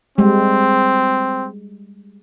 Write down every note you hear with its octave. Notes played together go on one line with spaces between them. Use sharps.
G3 G#3 C4